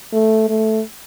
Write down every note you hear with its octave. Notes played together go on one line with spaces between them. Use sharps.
A3
A3